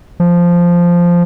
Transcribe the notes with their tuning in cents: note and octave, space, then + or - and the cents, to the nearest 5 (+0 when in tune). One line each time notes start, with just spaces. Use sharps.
F3 -5